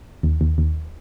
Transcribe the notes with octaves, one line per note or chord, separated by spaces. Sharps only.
D#2
D#2
D#2